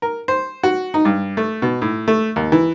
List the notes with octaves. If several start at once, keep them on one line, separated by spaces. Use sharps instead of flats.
A#4
C5
F#4
D#4
G2
A3
B2
A2
A3
D#2
E3